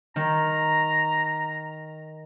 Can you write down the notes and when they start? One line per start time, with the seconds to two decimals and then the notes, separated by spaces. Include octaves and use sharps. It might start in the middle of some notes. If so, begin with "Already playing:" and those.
0.16 D#3 A#5